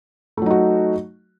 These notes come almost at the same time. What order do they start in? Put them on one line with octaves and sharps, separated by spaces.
A3 F#3 D#4 F#4